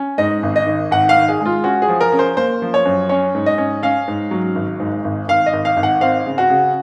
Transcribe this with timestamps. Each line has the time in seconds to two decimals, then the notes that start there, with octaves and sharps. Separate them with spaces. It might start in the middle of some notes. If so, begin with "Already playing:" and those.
Already playing: C#4
0.18 G#2 D#5
0.43 G#1
0.56 D#5
0.67 D#3
0.91 G#1 F#5
1.09 F5
1.16 D#3
1.29 G#4
1.40 G#3
1.46 F4
1.64 C#4 F#4
1.82 G#4
1.89 F3
2.01 A#4
2.12 C#4
2.19 C5
2.37 A#3 C5
2.62 F3
2.74 C#5
2.85 F#2
3.09 C#4 C#5
3.35 G#2
3.46 D#5
3.58 C#4
3.83 C#4 F5
4.08 G#2
4.31 F#3
4.55 G#1
4.80 G#2
5.04 G#1
5.28 G#1 F5
5.46 D#5
5.53 G#1
5.65 F5
5.77 G#1
5.83 F#5
6.01 C4 F5
6.26 C#3
6.38 F#4
6.50 C#3